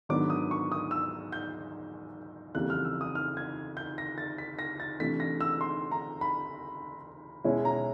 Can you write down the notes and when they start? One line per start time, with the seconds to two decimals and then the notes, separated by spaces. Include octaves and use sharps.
0.09 G#2 D#3 F#3 B3 D4 D6
0.30 D#6
0.51 C#6
0.72 D#6
0.91 E6
1.32 G6
2.55 F2 C#3 E3 G3 A#3 F#6
2.70 F6
2.85 E6
3.01 D#6
3.15 F6
3.37 G#6
3.77 G6
3.98 A#6
4.18 A6
4.38 B6
4.59 A#6
4.80 A6
5.00 C3 E3 A3 D4 B6
5.20 A#6
5.41 E6
5.61 C6
5.91 A#5
6.21 B5
7.44 B2 G#3 C#4 E4
7.65 A#5